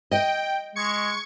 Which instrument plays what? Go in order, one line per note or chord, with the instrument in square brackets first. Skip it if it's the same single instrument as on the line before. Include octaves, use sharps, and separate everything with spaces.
[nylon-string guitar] D#5 [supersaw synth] G5
[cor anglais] G#3 [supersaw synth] C#6 G#6 C#7